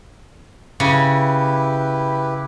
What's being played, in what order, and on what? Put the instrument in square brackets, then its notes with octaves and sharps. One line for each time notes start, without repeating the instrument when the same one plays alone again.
[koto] C#3 [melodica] E4 G4 B4